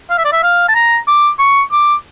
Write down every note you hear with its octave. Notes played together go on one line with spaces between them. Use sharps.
F5
E5
D5
E5
F5
A5
A#5
D6
C#6
D6